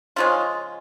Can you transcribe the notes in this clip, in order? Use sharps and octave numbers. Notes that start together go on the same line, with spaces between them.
C#3 F3 G#3 C#4 F4